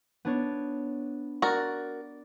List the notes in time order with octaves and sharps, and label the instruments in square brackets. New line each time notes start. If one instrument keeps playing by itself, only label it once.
[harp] B3 D4 C#5
[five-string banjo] F#4 A#4 [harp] D5